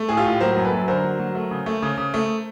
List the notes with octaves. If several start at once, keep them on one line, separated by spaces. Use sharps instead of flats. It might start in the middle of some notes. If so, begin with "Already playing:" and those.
Already playing: A3
A2 G#4
F4 G4
A2
F#3 A#4 C5
F#2
A4 B4
F#3
D3 A#4 C5
F#3
F#3
A3
C#3
A3
C#3
C#3
A3